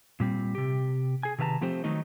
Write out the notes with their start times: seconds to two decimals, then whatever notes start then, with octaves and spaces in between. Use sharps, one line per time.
0.20 A#2 G3 C4
0.55 C3 G4
1.23 G#4 G#5
1.38 C3 D#3 B4 F5 A5 A#5
1.61 F3 A3 C4 G4 C5
1.84 D#3 F#3 A3 D#4 A4 D#5